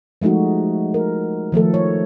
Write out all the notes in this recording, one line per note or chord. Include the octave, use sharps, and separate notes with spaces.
F3 G#3 A3 D#4 F#4
A#4
D#3 F3 A3 A4
C#5